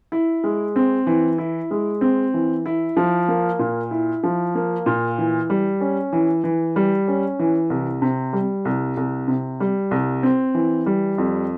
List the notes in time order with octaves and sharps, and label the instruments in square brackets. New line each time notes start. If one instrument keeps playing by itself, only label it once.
[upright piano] E4
G#3
C4
E3
E4
G#3
C4
E3
E4
F3
A#3
A#2
E4
F3
A#3
A#2
E3
G3
C#4
E3
E3
G3
C#4
E3
C2
C3
G3
C2
C2
C3
G3
C2
C4
E3
G3
F2